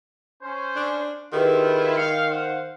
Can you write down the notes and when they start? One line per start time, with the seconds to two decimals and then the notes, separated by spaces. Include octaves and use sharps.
0.42 C#4 C5
0.76 D4
1.32 D#3 E4 F4 G4 G#4 B4
1.97 F5 C#7
2.30 C5 F5 F#5